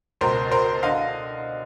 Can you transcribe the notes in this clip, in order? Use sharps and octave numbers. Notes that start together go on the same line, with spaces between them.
C#2 B2 A#4 C5
A#4 C5
D3 D#5 F5